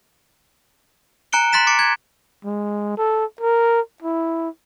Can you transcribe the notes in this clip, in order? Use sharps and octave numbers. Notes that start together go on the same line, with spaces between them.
G#5 A#5 F#6 C#7 D7 G7
C6 F#6 A6 B6 E7
D6 A6 C#7 D7
G#6
G#3
A4
A#4
E4